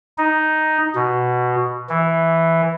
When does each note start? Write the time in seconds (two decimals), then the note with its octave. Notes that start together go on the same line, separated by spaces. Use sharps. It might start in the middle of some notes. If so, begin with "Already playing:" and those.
0.18 D#4
0.95 B2
1.89 E3